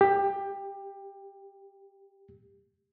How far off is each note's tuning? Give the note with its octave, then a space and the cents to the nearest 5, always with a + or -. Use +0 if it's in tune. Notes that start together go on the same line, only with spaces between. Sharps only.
G4 +15